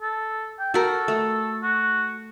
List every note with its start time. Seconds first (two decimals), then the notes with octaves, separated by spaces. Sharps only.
0.02 A4
0.60 G5
0.74 F#4 A4 A#4
1.08 A3
1.63 F#4